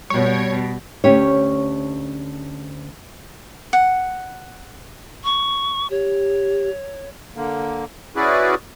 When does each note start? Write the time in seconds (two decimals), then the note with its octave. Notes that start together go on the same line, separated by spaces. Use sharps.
0.10 B2 G3 C#5
1.04 D2 C#4 G4 C#5
3.73 F#5
5.24 C#6
5.90 G4 C#5
7.36 D3 A#3
8.16 C#4 E4 F#4 G#4 B4 D5